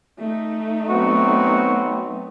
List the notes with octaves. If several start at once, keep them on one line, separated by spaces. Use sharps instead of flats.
A3 D#4
F#3 B3 C4 F#4